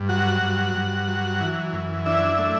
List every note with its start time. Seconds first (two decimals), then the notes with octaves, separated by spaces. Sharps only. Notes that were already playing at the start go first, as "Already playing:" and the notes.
Already playing: G2
0.09 F#3 F#4 F#5
0.42 G2
0.75 G2
1.07 F#3
1.40 E3
1.73 F#2
2.06 D4 E4 E5
2.38 A3